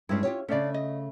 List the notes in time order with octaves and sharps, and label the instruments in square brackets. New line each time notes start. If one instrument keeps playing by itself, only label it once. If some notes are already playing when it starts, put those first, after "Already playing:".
[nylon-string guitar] G2 G#3 D4 [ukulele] C#4 E4
[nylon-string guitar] F4 G4 C#5
[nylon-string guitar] C#3 A3 [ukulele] C#4 D4 D5
[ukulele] D#5